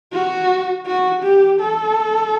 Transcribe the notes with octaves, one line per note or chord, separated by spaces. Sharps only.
F#4
F#4
G4
A4